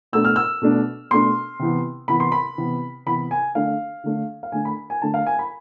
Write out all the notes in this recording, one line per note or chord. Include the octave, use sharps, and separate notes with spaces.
B2 A3 D4 E6
F6
E6
B2 A3 D4
B2 A3 D4 C6
C3 E3 B3
C3 E3 B3 B5
C6
B5
C3 E3 B3
C3 E3 B3 B5
G#5
D3 A3 D4 F5
D3 A3 D4
F5
D3 A3 D4 G#5
B5
G#5
D3 A3 D4 A5
F5
G#5
B5